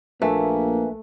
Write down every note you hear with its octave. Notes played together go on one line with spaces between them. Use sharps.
A#1 A3 A#3 B4 E5 G#5